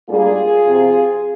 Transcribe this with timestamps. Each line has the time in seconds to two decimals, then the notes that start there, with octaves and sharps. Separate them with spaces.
0.09 G#2 G3 A#3 D4 F4 G#4
0.66 C3 F3 C4